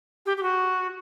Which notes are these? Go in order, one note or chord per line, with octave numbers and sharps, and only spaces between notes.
G4
G4
F#4